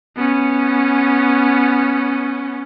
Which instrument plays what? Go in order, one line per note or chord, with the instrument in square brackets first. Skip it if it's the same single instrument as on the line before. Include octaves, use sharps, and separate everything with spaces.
[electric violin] B3 C#4